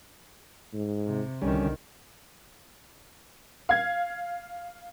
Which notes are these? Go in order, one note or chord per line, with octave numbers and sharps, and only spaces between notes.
G#2
C3
C2 D3 D#3 G3 C#4
F5 G#6